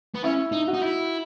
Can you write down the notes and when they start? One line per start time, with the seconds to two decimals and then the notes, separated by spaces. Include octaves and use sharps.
0.14 B3
0.24 C#4 E4
0.52 D#4
0.68 F#4
0.74 D#4
0.82 E4